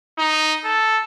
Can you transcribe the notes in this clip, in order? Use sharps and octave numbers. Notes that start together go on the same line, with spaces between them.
D#4
A4